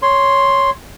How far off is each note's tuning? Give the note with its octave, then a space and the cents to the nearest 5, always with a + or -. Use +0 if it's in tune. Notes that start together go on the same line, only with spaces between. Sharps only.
C#5 +0 C6 +0